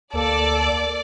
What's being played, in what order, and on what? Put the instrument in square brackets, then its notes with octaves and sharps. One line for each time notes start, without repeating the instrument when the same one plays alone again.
[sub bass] D2 [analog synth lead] A#3 [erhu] A4 [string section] D5